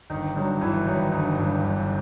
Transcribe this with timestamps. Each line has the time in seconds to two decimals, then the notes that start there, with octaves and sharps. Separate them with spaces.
0.10 G1 D#3 D#4
0.36 G2 D#3 F#3
0.61 G1 E3 E4
0.86 G2 D#3 F#3
1.12 G1 D#3 D#4
1.38 G2 D#3 F#3
1.63 G1